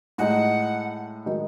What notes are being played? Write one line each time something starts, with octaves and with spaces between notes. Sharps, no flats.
A2 G#3 D#4 F#5
D#3 G#3 D#4 F#4